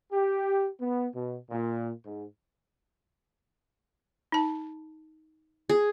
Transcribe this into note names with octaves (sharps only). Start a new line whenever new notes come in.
G4
B3
B2
A#2
G#2
D#4 A5
G#4